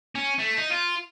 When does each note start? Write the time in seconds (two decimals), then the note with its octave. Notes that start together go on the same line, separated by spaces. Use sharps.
0.15 C#4
0.39 A3
0.57 D#4
0.70 F4